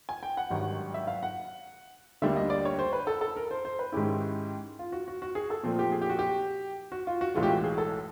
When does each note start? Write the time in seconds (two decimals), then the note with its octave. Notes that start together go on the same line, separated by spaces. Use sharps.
0.09 G#5
0.23 G5
0.37 F#5
0.50 G#1 G2 D#3 F#3
0.94 E5
1.07 F5
1.23 F#5
2.22 D2 D3 G3 A#3 D4 E5
2.37 D#5
2.50 D5
2.65 C#5
2.79 C5
2.93 B4
3.07 A4
3.21 A4
3.36 A#4
3.51 C5
3.65 C5
3.79 B4
3.92 G#2 D#3 G#3 C#4 E4 G4
4.79 F4
4.92 F#4
5.08 F#4
5.22 F#4
5.35 G#4
5.50 A4
5.63 A#2 F3 A3 C4
5.79 G4
5.92 G#4
6.02 G4
6.10 F#4
6.19 G4
6.92 F#4
7.07 F4
7.21 F#4
7.34 B1 A2 E3 G#3 F4
7.43 G4
7.50 F#4
7.64 G#4
7.78 A4